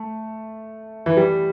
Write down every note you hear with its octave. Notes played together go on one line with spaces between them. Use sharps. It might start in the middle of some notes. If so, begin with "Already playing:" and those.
Already playing: A3
E3
G3